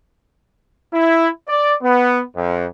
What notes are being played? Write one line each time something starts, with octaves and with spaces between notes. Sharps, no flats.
E4
D5
B3
F2